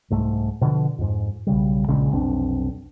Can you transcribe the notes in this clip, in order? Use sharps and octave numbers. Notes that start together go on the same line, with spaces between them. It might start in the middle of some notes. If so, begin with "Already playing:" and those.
C2 G#2 A3
B2 D3 F3
F2 G#2
B1 C#3 G3
A#1 C#3 G#3 C#4
F1 B1 C4 D4